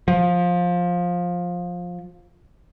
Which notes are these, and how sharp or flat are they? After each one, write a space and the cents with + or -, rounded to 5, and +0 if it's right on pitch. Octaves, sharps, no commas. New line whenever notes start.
F3 +15